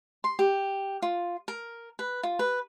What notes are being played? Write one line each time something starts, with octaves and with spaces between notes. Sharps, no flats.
C6
G4
F4
A#4
B4
F4
B4